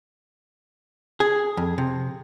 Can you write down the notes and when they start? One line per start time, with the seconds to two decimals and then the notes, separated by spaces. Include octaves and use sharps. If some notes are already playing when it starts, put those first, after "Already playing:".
1.20 G#4
1.57 F2
1.78 C3